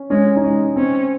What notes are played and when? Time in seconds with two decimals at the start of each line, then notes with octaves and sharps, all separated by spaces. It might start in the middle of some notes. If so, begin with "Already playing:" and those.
Already playing: C#4
0.10 G#3 C#4
0.36 D#4
0.44 G#3 C#4
0.76 C4 C#4